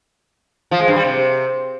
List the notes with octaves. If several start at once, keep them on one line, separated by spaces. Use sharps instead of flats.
F3
G#3
G2
G3
C3